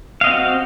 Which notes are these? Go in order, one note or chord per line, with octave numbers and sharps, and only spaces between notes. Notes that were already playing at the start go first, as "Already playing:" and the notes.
C4 F#4 D#5 F5